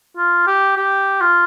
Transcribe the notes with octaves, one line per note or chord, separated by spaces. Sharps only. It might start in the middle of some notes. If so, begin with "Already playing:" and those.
F4
G4
G4
F4